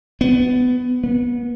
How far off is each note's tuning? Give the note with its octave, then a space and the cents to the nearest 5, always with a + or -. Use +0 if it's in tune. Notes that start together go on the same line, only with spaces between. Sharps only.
B3 +20
B3 -30